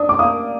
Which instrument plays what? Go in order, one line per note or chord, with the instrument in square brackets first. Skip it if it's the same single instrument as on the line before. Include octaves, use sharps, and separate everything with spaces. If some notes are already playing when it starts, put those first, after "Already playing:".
Already playing: [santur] D4 [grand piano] D#6
[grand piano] D6
[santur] A#3 [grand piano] D#6